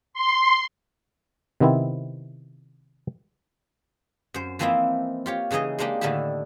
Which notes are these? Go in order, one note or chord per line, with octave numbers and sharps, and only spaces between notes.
C6
C3 D#3 B3 C4 E4
F#2 C5
E3 F3 A#3 C4 D#4 E4
F4 G4 C#5
C#3 E3 D#4 G#4 D#5
G#3 A#3 D4 D#4 G4
A2 D3 D#3 D4 E4 G4